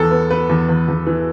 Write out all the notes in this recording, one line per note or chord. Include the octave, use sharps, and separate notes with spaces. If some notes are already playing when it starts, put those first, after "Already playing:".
Already playing: E2 A4
B3
B3 B4
E2
E2
E2
E3